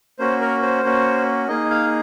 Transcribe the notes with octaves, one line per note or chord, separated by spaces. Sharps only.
A#3 C#4 F#4 C5
A#4
C5
A#3 C#4 F#4
A#3 D#4 G#4 D#5
F5